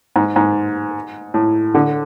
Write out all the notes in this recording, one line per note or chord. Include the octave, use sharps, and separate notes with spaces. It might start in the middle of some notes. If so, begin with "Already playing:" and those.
G#2
G#2
A2
D3